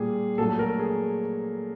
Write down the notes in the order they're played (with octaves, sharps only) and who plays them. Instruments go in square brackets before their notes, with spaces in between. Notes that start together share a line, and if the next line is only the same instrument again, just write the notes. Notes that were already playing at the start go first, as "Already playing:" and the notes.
Already playing: [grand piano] A#2 G3 G#4
A#2 F#3 A3 A4
A#4
G#4